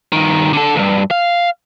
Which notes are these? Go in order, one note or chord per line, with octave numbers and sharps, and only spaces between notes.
G2 D#3
D3 A4
B1 G2
F5